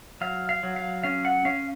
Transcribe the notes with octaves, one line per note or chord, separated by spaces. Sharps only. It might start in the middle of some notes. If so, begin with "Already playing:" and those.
F#3 F5
F5
F#3
F5
C#4 F5
F#5
C#4 F5